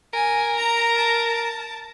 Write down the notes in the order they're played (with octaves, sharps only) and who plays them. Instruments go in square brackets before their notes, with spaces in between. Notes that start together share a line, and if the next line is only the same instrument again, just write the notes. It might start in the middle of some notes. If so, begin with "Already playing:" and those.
[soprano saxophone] A#4 [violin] G#5
[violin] A#5
A5